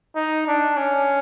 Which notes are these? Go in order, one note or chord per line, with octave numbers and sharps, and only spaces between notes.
D#4
D4
C#4